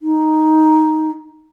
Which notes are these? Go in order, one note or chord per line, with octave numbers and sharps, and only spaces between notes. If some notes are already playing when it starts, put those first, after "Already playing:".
D#4